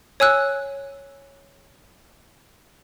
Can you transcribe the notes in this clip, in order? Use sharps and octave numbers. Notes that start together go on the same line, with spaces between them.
C#5 G#5 E6 F#6